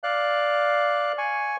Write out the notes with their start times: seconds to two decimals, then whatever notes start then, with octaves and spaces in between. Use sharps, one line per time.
0.03 D5 F5 F#6
1.18 G#5 C#6